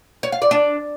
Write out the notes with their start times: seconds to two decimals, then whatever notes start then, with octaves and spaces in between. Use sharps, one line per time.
0.23 C#5
0.32 F5
0.42 D5
0.51 D4